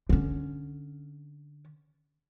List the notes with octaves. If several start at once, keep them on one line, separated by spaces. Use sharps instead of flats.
D3 C#4